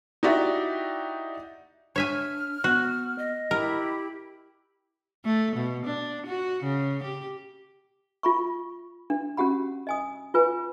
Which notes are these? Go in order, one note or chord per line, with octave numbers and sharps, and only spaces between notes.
D#4 E4 F#4 G4 D5 E5
D4 C#5 E5 G#5 F6
B3 F#4
D#5
E4 G4 A#4 B5
A3
B2
D4
F#4
C#3
G4
F4 B5 C#6
D4
C#4 F#4 G4 F#5 B5
D#5 G#5 D#6
F4 B4 G#5